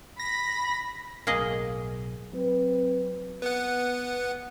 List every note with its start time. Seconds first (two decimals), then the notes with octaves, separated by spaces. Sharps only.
0.19 B5 A#6
1.27 B1 A2 A#3 G#4 D#5
2.33 F#3 C4 B4
3.42 B3 F#5